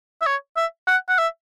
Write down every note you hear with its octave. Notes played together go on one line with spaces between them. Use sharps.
E5
C#5
E5
F#5
F#5
E5